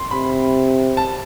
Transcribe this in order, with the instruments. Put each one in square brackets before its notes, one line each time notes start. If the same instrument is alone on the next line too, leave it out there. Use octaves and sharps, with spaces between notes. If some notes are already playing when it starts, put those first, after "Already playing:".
Already playing: [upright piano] C6
[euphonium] C3 [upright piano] B5
[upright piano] A5